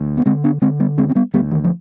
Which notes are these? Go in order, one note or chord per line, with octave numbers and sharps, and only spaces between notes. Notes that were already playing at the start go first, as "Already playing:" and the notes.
Already playing: D2
B3
D3 G#3 C4
B3 D4
D3 G#3 C4
G3 B3
D2 G#3 C4
C4
G3 B3
D2 G3 B3
D#3
F3